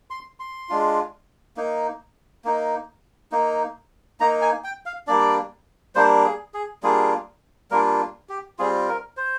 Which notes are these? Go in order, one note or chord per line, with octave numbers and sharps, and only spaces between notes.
C6
C6
G#3 D4 F4
A#3 D#4
A#3 D#4
A#3 D#4
A#3 D#4 A#5
G#5
G5
F5
G3 A#3 D4 D5
G3 A#3 D4 C5
G#4
G#4
G3 A#3 D4 F4 G#4
G3 A#3 D4 F4 A#4
G4
G3 C4 F4 G#4
A#4
C5